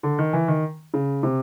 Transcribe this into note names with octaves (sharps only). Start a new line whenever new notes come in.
D3
D#3
E3
D#3
C#3
C3